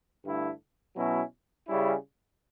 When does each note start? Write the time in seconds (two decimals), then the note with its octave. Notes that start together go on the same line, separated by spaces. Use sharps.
0.25 G2 D3 A3 E4
0.96 B2 F#3 C#4 E4
1.68 C#3 G3 C#4 E4